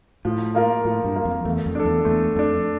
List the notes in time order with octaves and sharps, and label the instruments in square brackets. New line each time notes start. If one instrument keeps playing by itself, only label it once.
[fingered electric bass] A2 [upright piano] F3
[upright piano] A#3 F4 A#4
[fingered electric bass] A2 [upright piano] F3
[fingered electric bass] G2
[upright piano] A#3 F4 A#4
[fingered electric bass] F2
[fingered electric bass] E2 [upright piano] A3
[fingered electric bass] F2
[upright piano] D4 A4
[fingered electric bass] E2
[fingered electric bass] E2 [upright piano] A3
[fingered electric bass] F2 [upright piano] D4 A4